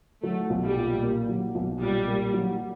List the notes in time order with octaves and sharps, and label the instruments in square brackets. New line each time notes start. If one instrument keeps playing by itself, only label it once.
[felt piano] F#3 [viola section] A3
[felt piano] B1
[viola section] G3
[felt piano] A#2
A#3
F#3
B1
[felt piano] A#2 [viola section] G3
[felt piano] A#3
F#3